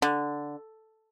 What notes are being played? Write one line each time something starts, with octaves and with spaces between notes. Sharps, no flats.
D3